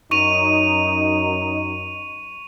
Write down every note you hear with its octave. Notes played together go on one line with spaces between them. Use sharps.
F#2 D#4 C#6 D#7 F7